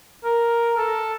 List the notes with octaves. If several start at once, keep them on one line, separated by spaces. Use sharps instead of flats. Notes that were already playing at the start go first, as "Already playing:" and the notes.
A#4
A4